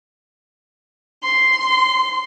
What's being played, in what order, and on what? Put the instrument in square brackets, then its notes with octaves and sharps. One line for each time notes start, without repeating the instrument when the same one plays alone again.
[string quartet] C6